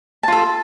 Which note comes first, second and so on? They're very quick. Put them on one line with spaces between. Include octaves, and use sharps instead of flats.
A5 F4 A4